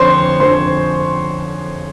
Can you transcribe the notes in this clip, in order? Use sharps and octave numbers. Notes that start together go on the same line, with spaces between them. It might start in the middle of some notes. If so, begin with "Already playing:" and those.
Already playing: F2 D3 F3 C5 C#5 C6
F2 D3 F3 C5 C6